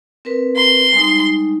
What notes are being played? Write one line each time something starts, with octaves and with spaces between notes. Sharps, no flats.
C4 A#4 B4
C6
G3 G#3 D#4